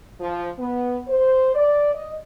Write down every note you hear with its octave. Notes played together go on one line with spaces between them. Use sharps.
F3
B3
C5
D5
D#5